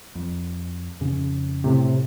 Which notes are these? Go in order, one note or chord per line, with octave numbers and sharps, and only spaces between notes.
F2
F2 C#3 C#4
A2 C3